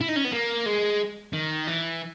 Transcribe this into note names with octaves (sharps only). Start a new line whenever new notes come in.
E4
D#4
C#4
B3
A#3
G#3
D#3
E3